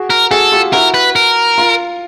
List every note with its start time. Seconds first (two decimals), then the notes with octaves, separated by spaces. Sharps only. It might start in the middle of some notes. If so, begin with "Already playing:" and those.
Already playing: F#4 G#4
0.10 A#4
0.31 F#4 G#4 A4
0.52 F4 G4
0.73 E4 F#4 A#4
0.94 B4
1.16 A#4
1.58 F4